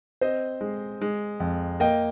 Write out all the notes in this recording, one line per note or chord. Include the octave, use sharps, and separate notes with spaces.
C4 C5 D#5
G#3
G#3
F2
A#3 D#5 G5